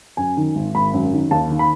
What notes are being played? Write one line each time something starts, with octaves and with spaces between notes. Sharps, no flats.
F#2 G#5
D#3
G#1
G#1 B5
F#2
D#3
D#2 A5
D#3
B5